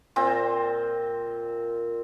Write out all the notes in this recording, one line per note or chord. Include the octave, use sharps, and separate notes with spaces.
A#2 C4